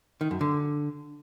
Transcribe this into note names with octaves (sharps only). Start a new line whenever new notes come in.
D#3
F#2
D3